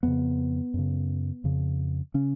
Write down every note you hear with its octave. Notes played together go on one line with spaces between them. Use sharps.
F2 C#3 B3
F#2 C#3
F2 C#3
C#3 C#4